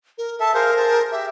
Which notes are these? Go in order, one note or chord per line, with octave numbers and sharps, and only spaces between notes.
A#4
A4 E5 A5
G#4 A#4 C5 F5
G#4 C5 A5
G4 E5